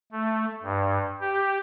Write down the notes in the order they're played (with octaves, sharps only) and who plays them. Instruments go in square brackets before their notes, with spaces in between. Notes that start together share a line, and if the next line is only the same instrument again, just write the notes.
[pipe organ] A3
G2
G4